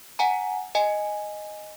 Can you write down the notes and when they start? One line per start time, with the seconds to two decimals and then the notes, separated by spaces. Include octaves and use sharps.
0.19 F#5 G#5 A#5
0.75 D#5 G#5